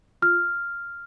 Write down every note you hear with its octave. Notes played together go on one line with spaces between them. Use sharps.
F4 F6